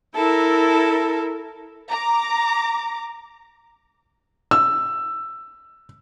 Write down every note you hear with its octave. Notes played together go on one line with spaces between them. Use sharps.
E4 A4 A#4
A#5 D6
E6